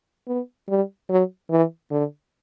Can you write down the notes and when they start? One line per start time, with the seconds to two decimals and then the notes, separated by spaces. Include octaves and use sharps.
0.27 B3
0.69 G3
1.09 F#3
1.50 E3
1.91 D3